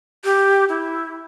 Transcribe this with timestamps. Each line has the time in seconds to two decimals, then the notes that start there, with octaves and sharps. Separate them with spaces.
0.24 G4
0.69 E4